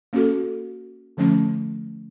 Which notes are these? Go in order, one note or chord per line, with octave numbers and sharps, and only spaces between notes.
A#3 C#4 F#4 A4
D3 F3 A3 C#4